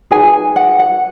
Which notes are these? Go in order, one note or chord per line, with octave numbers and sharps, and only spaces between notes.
D#4 G#4 B4 G#5
F#5
F#5